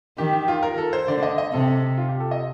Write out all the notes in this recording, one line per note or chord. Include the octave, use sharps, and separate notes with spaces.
D#3 G4
G4
F4
A#4
A4
C5
D3 D5
D#5
D#5
C3 A4
F4
G4
A4
D#5